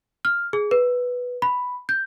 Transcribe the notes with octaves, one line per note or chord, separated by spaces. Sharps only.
F6
G#4
B4
B5
G6